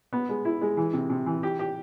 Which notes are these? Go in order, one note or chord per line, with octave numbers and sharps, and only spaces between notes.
B3
G#3
E4
G#3
E3
C3
C3
E3
G4
G4